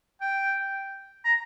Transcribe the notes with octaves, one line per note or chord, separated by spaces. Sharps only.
G5
A#5